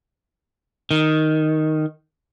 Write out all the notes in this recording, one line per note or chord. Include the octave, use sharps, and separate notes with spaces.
D#3